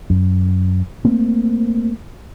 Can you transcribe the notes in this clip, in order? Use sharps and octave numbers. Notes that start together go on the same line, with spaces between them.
F#2
A3 A#3 C4